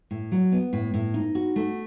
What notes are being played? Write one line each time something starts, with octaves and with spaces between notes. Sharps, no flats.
A2
F#3
B3
A2
A2
D#4
F#4
A3